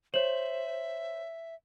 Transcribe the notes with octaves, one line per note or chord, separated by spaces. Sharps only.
C5 C#5 E5 F#7